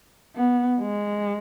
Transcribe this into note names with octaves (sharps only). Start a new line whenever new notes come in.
B3
G#3